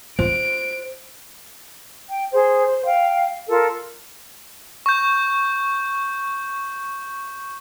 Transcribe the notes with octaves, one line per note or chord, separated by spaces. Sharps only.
F4 C5 D7
G5
G#4 C5
C5
F5 G5
F4 A4 A#4
C#6 G6